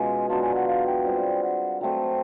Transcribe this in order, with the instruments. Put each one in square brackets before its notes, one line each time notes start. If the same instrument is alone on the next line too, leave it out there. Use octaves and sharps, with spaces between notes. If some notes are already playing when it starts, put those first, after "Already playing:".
Already playing: [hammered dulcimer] B2 G#3 C#4 F4 [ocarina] G#5
[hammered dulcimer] F#3 B3 D4 F4 [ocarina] A5
[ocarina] G#5
F#5
F5
G5
[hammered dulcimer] G3 C4 F4 G#4
[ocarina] F#5
[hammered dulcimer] F#3 A3 C4 [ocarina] G5